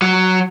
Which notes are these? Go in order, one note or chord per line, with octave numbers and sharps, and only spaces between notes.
F#3